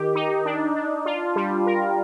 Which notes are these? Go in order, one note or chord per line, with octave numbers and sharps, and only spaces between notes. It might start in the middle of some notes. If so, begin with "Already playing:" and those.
Already playing: D#3 G4
D#4
D4
D4
F4
G3
A#4